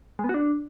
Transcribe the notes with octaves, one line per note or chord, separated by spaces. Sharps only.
G#3
B3
F#4
D4